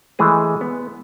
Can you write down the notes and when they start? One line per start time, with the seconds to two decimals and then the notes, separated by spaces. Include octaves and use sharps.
0.19 E3 G#3 A3 G#4
0.61 B3